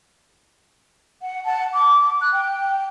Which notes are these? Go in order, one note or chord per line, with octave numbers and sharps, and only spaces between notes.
F#5
F#5 A5
D6
F#6
G5